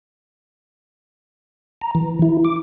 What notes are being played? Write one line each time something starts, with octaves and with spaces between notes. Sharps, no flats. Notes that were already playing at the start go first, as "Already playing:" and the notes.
A#5
E3
E4
D6